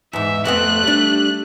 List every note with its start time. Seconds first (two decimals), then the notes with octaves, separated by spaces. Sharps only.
0.13 E2 G#2 E5
0.45 F2 A3 B3 C4 F#6
0.83 G3 D4